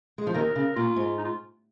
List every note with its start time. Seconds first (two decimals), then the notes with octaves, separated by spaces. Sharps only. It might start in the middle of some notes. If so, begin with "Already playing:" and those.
0.18 G#3
0.27 F3
0.34 D#2 D#3 A#4
0.56 C#3
0.76 A#2 F4
0.96 G#2
1.18 D#4
1.25 F4